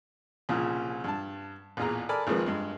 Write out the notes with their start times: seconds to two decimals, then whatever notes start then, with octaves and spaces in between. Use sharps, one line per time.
0.49 C2 A#2 C#3 F3
1.04 G2 A5
1.77 A1 E2 A#2 G#4 A#5
2.09 A4 A#4 D5 G#5 B5
2.27 G#1 F2 F3 G#3 A#3 B4
2.46 G2 G#3